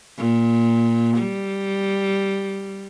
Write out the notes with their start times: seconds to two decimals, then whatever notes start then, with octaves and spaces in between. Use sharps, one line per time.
0.18 A#2
1.18 G3